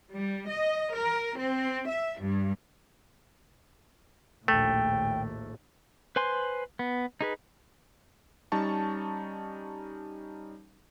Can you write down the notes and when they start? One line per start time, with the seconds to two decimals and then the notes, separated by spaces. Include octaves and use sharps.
0.12 G3
0.49 D#5
0.95 A#4
1.38 C4
1.89 E5
2.21 G2
4.48 A#1 D#2 A2 A3 G5
6.16 B4 C5 G#5 C6
6.79 B3
7.21 D#4 G#4 B4
8.52 G3 C#4 D#4 A5 C#6